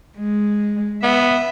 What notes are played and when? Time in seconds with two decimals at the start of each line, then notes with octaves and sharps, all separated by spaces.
0.18 G#3
1.03 B3 E5